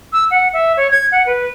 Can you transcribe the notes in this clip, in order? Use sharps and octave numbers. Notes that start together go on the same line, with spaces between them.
E6
F#5
E5
C#5
G#6
F#5
B4